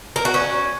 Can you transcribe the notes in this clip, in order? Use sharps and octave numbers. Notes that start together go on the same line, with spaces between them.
A#4
F#4
C#4